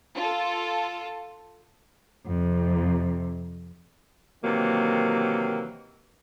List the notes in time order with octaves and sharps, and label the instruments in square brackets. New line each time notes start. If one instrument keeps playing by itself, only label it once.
[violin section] F4 A4
[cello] F2 C3
[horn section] C3 D#3 E3 F#3 A#3